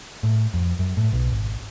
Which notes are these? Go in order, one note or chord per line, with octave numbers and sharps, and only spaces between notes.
A2
F2
F#2
A2
B1
G#1